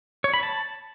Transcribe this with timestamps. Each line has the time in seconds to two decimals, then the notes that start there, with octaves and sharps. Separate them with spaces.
0.24 C#5
0.34 B5
0.43 A5